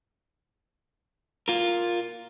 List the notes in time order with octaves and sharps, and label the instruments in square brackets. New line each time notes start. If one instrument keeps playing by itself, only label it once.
[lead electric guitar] F4 A#4